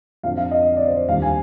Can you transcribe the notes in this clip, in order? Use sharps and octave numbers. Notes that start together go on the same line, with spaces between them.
F2 D3 F3 F5
F5
D#5
D5
C5
D#2 D3 G3 F5
G#5